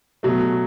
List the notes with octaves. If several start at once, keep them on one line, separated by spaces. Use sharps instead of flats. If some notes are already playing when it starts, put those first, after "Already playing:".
B2 F#3 A3